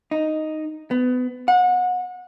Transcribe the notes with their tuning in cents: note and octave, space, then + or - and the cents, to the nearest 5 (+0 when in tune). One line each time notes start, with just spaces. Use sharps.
D#4 +0
B3 +25
F#5 -30